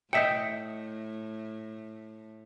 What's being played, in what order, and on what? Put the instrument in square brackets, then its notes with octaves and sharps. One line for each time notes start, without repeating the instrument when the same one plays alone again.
[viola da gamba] A2 [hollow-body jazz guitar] D#5 E5 G5 [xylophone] G6 B6 C#7